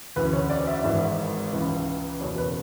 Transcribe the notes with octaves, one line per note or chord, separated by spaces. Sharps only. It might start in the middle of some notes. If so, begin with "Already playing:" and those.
D2 C#3 E3 B4
C#5
D5
E5
G#1 G#2 E3
C#2 C#3 E3
F#1 E2 B2 C#5
B4